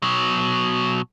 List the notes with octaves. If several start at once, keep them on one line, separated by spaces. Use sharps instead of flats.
B2 F#3